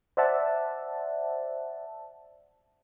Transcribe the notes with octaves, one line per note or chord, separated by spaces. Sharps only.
C5 D5 E5 F#5 A5